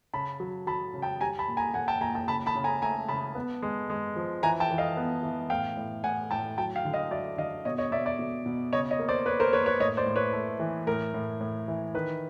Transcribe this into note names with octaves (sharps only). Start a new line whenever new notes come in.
C#3 A5 B5
F#3
F#3 A5 B5
C#3
G5 A5
G3 G#5 A#5
A5 B5
A#2
G#5 A#5
A#2 F#5 G#5
G5 A5
A#2 G#5 A#5
G5 A5
C#3 A5 B5
A5 B5
C#3
G#5 A#5
A3 G#5 A#5
C#3 A5 B5
B3
G#3
G#3
F3
E3 G#5 A#5
G5 A5
E3
D#5 F5
B3
E3
A2 F5 G5
A2
A2 F#5 G#5
A2 G5 A5
F#3 G5 A5
F5 G5
D3
D#5 F5
F#3 D5 E5
D3 D#5 F5
B2 C#5 D#5
C#5 D#5
B2 D5 E5
D5 E5
B2
B2
C#3 C#5 D#5
C#5 D#5
A#3
C5 D5
A#3 B4 C#5
A#4 C5
A#3 B4 C#5
B4 C#5
A2 C#5 D#5
C5 D5
A2
B4 C#5
A3
E3
A2 A#4
A2
A2
E3
D#3 B4